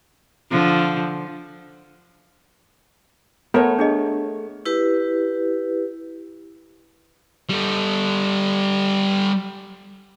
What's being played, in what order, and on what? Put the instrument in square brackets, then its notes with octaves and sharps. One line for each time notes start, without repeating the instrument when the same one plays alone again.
[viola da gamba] D3 F3
[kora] A3 C#5 [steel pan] B3 A#4
[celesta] D4 G#4 D#5
[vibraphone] E4 G4 B4
[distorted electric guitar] G3 A4